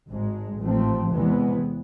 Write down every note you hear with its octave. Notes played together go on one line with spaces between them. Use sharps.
G#1 G#2 G#3
A1 G#2 F3 A3 C4
E2 C3 E3 G#3 B3